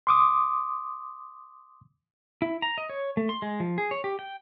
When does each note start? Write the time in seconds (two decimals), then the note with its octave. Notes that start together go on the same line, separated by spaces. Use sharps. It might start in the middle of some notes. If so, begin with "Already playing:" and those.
0.07 C6 D6 D#6
2.42 E4
2.62 A#5
2.78 D#5
2.90 C#5
3.17 A3
3.29 C6
3.42 G#3
3.60 F3
3.78 G#4
3.91 C#5
4.04 G4
4.19 G5